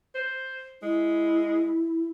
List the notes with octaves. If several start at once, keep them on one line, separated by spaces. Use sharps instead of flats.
C5
G#3 E4